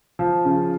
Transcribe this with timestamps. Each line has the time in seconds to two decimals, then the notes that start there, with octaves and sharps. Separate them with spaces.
0.19 F3
0.45 C#3